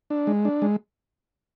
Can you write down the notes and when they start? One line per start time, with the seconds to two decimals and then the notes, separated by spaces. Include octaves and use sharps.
0.10 D4
0.27 G#3
0.45 D4
0.62 G#3